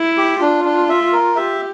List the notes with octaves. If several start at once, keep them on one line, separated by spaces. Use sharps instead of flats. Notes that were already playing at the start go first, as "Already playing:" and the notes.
Already playing: E4
G4
D4 F4
D4
E5
A#4
G4 E5